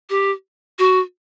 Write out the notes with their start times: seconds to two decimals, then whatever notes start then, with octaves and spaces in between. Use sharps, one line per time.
0.10 G4
0.79 F#4